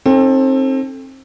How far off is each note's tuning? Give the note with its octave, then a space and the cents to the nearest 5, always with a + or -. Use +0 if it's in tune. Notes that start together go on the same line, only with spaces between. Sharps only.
C4 +30 D#4 +0 A4 +0